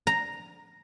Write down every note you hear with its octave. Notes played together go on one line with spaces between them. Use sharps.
A#5